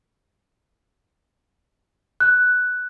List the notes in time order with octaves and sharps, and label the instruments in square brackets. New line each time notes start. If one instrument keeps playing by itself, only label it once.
[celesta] F#6